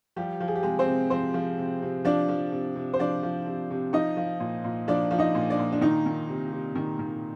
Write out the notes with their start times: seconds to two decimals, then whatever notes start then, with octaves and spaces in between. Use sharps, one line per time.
0.16 F3 G3 G4
0.40 F3
0.48 G#4
0.56 G4
0.63 C3 G#3 G#4
0.79 C4 C5
0.87 C3
1.10 F3 C4 C5
1.34 F3
1.58 C3
1.82 C3
2.05 F3 D4 D5
2.29 F3
2.52 C3
2.76 C3
2.94 C5
2.99 F3 D4 D5
3.23 F3
3.46 C3
3.71 C3
3.93 F3 D#4 D#5
4.17 F3
4.40 A#2
4.64 A#2
4.88 F3 D4 D5
5.11 F3
5.18 D#4 D#5
5.35 A#2
5.50 D4 D5
5.59 A#2
5.72 D4
5.81 D#3 D#4
6.06 D#3
6.29 C3
6.52 C3
6.75 D#3
6.99 D#3